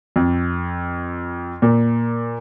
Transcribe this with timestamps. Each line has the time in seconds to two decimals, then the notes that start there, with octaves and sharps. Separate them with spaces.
0.16 F2
1.62 A#2